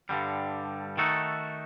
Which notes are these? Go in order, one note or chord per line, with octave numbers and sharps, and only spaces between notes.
G2 D3 G3
D#3 A3 D#4 F#4 A4